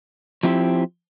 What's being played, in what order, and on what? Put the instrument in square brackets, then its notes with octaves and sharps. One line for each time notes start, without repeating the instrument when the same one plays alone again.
[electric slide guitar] F3 C4 E4 G4